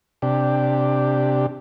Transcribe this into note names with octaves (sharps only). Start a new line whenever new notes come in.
C3 D4 G4